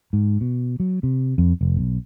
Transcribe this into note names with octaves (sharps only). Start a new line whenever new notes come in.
G#2
B2
F#3
C3
F2
F1
B1